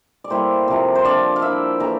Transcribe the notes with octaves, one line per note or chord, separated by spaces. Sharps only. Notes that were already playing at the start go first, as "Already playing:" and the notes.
D5
A2 G3 A#3 E4 C5
C3 F3 A#3
C5
F3 A#3 D4 F4 D5
F5
F3 A#3 E4 E5
A2 E3 A#3 A#5